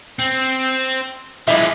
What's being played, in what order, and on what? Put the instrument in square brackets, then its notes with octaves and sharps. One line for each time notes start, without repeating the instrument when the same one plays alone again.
[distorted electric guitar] C4
[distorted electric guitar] E3 F3 [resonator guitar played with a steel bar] G3 G#3 E5